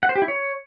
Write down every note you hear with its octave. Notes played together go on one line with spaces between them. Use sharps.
F#5
C5
G4
E4
C#5